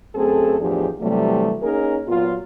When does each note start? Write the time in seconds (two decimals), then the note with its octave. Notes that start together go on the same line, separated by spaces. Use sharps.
0.15 F#2 A3 C4 G#4 A4
0.60 E2 A2 F3 D4 G4 G#4
1.00 C3 E3 F#3 G3 A3
1.61 A#3 C#4 D#4 G#4 A#4
2.07 A#2 F#3 B3 F4